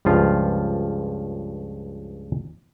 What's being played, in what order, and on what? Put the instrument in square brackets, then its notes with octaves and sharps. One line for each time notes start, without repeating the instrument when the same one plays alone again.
[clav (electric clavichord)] C#2 G2 F3 F4 F5